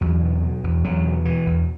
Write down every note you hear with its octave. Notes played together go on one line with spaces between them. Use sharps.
E2 F#3
B2
B2
E2
E2 F#3
B2
B2 E3
E2